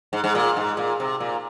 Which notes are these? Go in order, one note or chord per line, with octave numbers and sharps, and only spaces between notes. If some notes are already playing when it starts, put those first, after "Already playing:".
G#2
G#2
A#2
G#2
A#2
C3
A#2